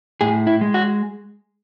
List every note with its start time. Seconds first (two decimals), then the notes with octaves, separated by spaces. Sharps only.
0.21 A2 G#4
0.47 E4
0.61 G#3
0.74 F#4